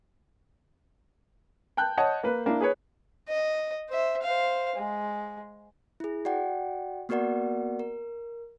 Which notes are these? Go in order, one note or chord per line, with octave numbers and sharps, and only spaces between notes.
G5 A5 F#6 G6
C#5 D#5 F#5 A5
A#3 B4
A#3 D4 E4
G#4 B4 C#5
D#5
C5 E5
C5 F5
G#3
E4 G#4
F#4 D5 F#5 G5
A#3 B3 F#4 A#4 D5 F#5
A#4